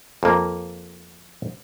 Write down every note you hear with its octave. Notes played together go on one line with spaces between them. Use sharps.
F2 A#3